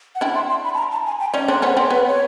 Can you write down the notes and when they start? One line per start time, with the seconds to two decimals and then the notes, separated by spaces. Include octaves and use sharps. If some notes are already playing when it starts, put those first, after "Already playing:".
0.15 F#5
0.21 D4 E4 G5
0.35 C6
0.50 C6
0.64 B5
0.74 A5
0.78 A#5
0.92 A5
1.06 G#5
1.20 G5
1.34 C#4 D#4 D5
1.48 C4 D4 C#5
1.62 B3 C#4 C5
1.76 C4 C#5
1.90 B3 B4
2.08 C#5